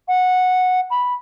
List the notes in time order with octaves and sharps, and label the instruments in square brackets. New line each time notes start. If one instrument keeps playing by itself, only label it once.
[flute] F#5
B5